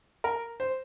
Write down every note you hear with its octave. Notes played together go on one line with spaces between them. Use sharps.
A#4
C5